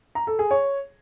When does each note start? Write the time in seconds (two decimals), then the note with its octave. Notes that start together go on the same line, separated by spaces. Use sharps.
0.15 A#5
0.27 A4
0.39 G#4
0.51 C#5